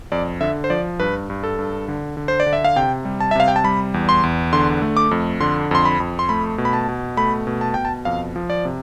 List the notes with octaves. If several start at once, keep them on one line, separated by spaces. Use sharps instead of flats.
F2 D5
D3 E5
C5
F3 D5
G2 B4
G2
A4
G2
D3
D3
C5
D5
D3
E5
F5
C3 G5
G3
A5
E5
C3 F5
G5
A5
G3 B5
E2
C6
E2
D3 C6
A3
D6
F2
D3 C6
F2 C6
B5
F2
C6
A3 B5
B2
B5
A5
B2
A3 B5
B2
A5
B2 G5
A5
F2 F5
F3
D5
C3